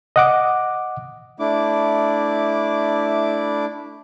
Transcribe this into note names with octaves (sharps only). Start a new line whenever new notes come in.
D#5 F#5 D6
A3 D4 E4 D6